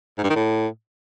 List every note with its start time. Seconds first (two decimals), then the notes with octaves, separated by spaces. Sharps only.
0.18 G#2
0.24 G2
0.30 D#3
0.36 A2